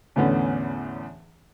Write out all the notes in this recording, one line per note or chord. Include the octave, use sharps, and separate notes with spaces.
E2 A2 D3 B3 C#4